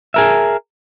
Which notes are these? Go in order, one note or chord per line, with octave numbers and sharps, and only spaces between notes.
G#4 A#4 E5